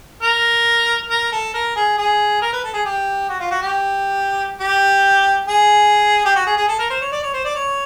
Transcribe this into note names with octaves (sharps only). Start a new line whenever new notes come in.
A#4
A#4
A4
A#4
G#4
G#4
A#4
B4
A4
G#4
G4
F#4
F4
F#4
G4
G4
G#4
G4
F#4
G#4
G#4
A4
A#4
C5
C#5
D5
C#5
C5
D5
C#5